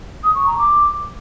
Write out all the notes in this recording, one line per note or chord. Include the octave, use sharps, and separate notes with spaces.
D#6
C#6
A#5
D6